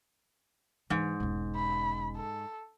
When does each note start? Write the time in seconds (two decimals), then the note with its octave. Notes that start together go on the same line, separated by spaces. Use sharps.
0.90 G#2 E3
1.20 E1 C#4
1.56 B5
2.17 A4